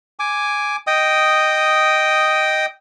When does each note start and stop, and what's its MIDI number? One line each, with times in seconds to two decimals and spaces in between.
0.19 0.76 80
0.19 0.76 86
0.87 2.66 75
0.87 2.66 79
0.87 2.66 87